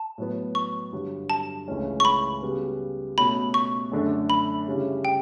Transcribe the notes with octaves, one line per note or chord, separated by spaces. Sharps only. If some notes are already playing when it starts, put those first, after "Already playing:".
Already playing: A5
A2 F#3 B3
C#6
G2 D3 F#3
A5
C#2 C#3 E3 A3 C#4
C#6
B5
C#3 G3 B3 F#4
B2 A3 C#4 F#4 B5
C#6
F#2 D3 A3 D4 A4
B5
C#3 G3 C#4 E4
G5